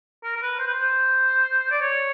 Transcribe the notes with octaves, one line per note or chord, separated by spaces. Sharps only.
A#4
A#4
B4
C5
B4
C5
D5
C#5